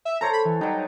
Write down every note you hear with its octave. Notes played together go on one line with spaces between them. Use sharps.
E5
A4 C5 C#5 A#5
B5
E3
F#3 G3 D#4